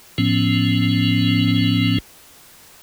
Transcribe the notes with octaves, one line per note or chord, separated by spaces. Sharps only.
A2 F3 B3 C#4